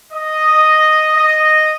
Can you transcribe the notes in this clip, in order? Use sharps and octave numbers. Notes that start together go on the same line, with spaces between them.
D#5
D#5